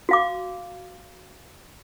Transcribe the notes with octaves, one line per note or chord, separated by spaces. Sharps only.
F#4 F5 D6